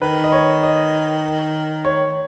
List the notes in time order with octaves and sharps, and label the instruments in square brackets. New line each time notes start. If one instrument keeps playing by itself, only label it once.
[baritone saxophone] D#3 [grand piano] B4
[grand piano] D#5
C#5
D#5
C#5